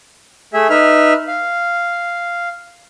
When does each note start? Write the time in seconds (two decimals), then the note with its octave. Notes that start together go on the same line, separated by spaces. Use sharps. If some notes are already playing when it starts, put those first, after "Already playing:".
0.54 A3 G#4 E5
0.70 D#4 B4 E5 F6
1.28 F5